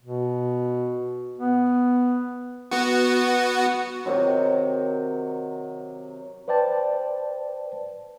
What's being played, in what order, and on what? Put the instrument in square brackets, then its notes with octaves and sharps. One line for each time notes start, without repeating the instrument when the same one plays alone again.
[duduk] B2
B3
[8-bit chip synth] B3 F#4
[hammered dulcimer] C3 D#3 F#3
[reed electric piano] B4 C5 D5 G5 A5